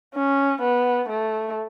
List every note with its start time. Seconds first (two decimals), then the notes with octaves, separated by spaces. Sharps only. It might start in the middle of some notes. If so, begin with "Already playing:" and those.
0.14 C#4
0.62 B3
1.09 A3